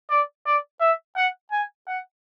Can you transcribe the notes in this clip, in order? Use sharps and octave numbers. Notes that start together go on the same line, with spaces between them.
D5
D5
E5
F#5
G#5
F#5